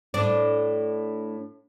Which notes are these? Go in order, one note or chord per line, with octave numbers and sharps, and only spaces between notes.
A2 D4